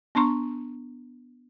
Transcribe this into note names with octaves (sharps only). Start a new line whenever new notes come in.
B3 D4 A#5 C6 C#6